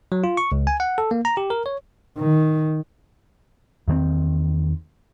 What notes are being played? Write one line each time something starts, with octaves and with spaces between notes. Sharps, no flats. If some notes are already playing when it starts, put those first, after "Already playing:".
F#3
F4
C#6
C#2
G#5
F#5
A4
A#3
A#5
G4
A#4
C#5
D#3
E2 D#3 A#3 C4